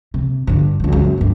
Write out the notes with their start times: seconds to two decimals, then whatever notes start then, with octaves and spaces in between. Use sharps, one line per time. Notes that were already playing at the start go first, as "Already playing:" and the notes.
0.14 C3
0.47 G2 D3
0.80 C#2 F#3
0.92 F#2
1.18 B1 G2